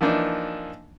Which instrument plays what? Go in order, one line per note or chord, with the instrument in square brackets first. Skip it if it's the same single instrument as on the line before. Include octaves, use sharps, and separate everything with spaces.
[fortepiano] E3 F3 A#3 D4 D#4